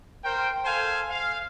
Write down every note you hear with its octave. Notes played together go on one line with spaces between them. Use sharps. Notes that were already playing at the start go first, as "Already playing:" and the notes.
A#4 C5 G5
A4 C5 F5 G#5
F5